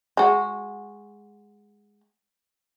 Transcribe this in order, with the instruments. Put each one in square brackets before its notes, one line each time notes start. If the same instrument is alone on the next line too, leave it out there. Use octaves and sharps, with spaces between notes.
[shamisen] G#3 F#4